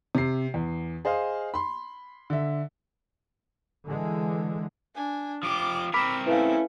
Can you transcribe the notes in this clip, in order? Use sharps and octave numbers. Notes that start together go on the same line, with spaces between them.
C3 C7
E2
G#4 C5 D#5 F5
B5 C6
D3 E5
D3 E3 G#3
D4 G#5
F3 G4 D6
C4 A#4 B5 D6 E6 B6
A3 C#4 E4 B4 F5